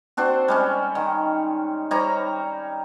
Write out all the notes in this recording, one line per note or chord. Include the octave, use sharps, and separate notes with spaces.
C4 D4 F#4 C5
G3 G#3 C#4
D#3
G3 D#4 C#5 A#5